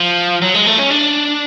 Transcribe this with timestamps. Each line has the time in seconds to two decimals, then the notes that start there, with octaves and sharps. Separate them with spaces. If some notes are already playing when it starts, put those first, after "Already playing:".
Already playing: F3
0.42 F#3
0.54 G#3
0.66 A3
0.78 C#4
0.90 D4